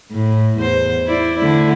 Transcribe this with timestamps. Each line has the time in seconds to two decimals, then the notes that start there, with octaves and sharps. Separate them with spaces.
0.11 A2
0.59 E2 C5
1.06 E4 D5
1.38 D3 A3 E4